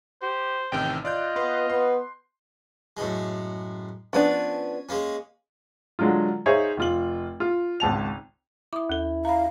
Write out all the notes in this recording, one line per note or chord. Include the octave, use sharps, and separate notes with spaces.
G4 C5
A1 C3 D#3 G5
F4 D5 D#5 F#6 G6
B3 B4 C6
B3 C6
F#2 A2 G#3
F3 B3 C#4 D4 G#5
G#3 A#3 C#4
D3 F#3 G#3 F4
D#4 G#4 C5 C#5 E5 F5
F1 F4 F#7
F4
G#1 C#2 A5 F7
E4 D6 D#6
D#2 A4
F5 A#5 B5